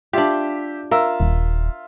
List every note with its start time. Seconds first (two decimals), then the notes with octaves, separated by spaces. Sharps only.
0.13 D4 F4 G4 E5
0.91 F4 A#4 E5 E6
1.20 D#1